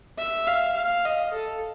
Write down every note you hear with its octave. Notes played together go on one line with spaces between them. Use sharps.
E5
F5
F5
D#5
A4